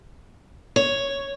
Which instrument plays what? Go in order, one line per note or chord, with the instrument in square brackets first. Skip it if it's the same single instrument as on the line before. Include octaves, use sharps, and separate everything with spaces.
[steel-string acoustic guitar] C#5